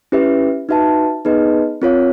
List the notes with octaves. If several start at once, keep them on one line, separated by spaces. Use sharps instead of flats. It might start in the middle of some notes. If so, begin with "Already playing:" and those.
C#4 E4 G4 B4 E5
D#4 F#4 B4 E5 A5
B3 D#4 G#4 B4 D#5
C4 F4 A#4 C#5 F5